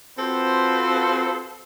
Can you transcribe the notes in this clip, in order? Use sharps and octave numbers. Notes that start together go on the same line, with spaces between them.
C4 F4 F#4 A4 B4 C5